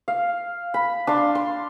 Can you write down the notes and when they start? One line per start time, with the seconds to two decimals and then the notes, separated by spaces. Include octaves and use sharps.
0.08 F5
0.74 B5
1.07 D4 F5 C6
1.35 C6